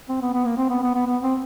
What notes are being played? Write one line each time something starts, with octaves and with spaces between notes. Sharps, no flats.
C4
B3
B3
A#3
C4
B3
B3
B3
B3
C4